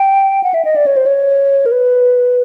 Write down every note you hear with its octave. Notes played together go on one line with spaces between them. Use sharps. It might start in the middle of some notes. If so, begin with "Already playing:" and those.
Already playing: G5
F#5
E5
D#5
D5
C#5
C5
C#5
A#4
B4